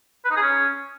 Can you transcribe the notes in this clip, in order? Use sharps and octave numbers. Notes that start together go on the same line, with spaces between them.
B4
D#4
G#4
C#4